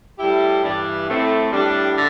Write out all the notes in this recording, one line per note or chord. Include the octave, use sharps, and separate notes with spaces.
A2 G3 E4 G4
G2 E3 G3 D4
A2 A3 C4
A2 G3 D4 G4
D3